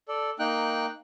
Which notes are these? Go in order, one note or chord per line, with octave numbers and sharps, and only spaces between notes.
A4 D5
A#3 D#4 G5 F#6